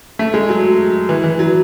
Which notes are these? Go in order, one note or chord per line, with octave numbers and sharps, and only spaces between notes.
A3
G#3
F#3
E3
E3
F#3